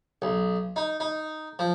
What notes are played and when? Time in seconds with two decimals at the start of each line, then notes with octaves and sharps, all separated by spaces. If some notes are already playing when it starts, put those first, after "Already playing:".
0.22 B1
0.76 D#4
1.00 D#4
1.59 F3